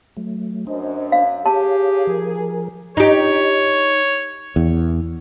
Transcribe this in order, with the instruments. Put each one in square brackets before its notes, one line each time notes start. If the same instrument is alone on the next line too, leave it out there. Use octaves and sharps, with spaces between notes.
[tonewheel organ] F#3 A3
[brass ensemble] F#2 [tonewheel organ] D4 C5 D#5
[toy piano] F5
[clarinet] G4 [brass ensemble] G#4 [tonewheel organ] C#5 F5 [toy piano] A5
[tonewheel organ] F3 A#4
[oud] D#4 G4 [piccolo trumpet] C#5
[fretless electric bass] E2